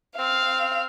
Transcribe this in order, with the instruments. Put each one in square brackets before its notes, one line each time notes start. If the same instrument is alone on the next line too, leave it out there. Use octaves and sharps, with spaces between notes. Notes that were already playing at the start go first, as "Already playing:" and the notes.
[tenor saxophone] C4 [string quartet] F5